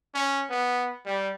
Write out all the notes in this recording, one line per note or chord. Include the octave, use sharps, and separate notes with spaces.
C#4
B3
G3